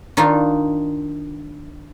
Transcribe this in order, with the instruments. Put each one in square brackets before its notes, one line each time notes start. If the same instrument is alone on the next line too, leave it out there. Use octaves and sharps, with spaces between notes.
[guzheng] D#3 D4 D#4 F4